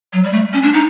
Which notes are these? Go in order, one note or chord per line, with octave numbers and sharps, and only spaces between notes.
F#3
G3
A3
C#4
D4
D#4